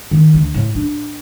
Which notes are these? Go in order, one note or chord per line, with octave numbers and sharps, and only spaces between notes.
D#3
D2
A2
D4